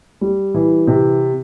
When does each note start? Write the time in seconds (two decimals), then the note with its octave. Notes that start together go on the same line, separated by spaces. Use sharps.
0.21 G3
0.54 E3
0.87 C3